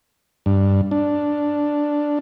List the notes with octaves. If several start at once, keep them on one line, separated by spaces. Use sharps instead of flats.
G2
D4